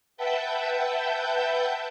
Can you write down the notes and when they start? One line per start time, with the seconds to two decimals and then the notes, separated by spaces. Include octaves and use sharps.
0.17 B4 E5 F#5 G5 A5 G6